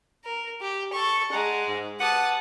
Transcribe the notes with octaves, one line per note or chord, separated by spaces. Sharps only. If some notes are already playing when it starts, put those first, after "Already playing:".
A#4
G4
A4 C#6
G#3 F#5 A#5
G#2
G4 B4 F#5 A5 D#6